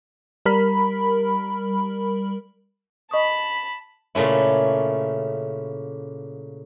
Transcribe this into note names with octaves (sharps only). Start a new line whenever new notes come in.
G3 A#4 B5
D#5 A5 B5 C#6 D#6
A#2 C#3 A3 C#4 E4